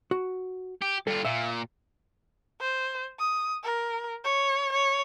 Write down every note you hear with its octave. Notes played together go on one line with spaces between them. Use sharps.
F#4
G4
G2 F4 A4
A#2 E5 F5
C5
D#6
A#4
C#5
C#5